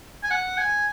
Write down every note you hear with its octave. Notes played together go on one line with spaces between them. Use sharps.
G#5
F#5
G#5